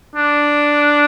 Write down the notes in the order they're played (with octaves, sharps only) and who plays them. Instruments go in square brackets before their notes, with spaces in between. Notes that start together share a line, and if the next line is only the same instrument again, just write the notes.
[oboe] D4